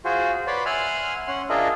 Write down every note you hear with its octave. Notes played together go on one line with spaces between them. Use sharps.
F4 F#4 G#4 C5
B4 C#5 D5 B5 C6
E5 F#5 G#5 C6 F6
C#4 F#5 C6
D4 F4 G#4 A#4 D#5 E5